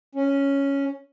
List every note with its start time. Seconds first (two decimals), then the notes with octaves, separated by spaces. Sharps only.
0.15 C#4